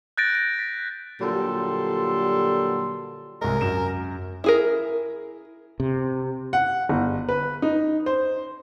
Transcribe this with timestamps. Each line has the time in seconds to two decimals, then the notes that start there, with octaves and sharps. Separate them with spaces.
0.17 F#6 G6 A6 A#6 D7
0.35 D7
0.59 B6
1.20 A#2 D3 F#3 G3 A4 C6
3.41 C2 G#3 A#4
3.61 F#2 E7
4.44 E4 G#4 A#4
5.80 C3
6.53 F#5
6.89 G1
7.29 B4
7.62 D#4
8.06 C5